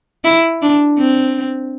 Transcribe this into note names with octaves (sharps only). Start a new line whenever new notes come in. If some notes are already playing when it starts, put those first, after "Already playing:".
E4
D4
C4